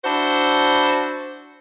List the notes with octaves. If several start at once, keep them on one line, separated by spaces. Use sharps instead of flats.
D4 E4 F#4 C5